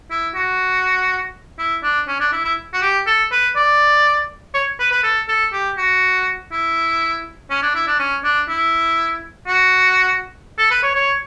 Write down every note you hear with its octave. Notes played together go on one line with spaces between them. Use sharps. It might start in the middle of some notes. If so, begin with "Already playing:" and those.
E4
F#4
E4
D4
C#4
D4
E4
E4
F#4
G4
A4
B4
D5
C#5
B4
B4
A4
A4
G4
F#4
E4
C#4
D4
E4
D4
C#4
D4
E4
F#4
A4
B4
C#5
C#5